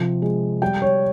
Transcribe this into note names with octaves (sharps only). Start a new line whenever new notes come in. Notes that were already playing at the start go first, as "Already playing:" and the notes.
Already playing: C3 F3
G#3
G3 G5
C#5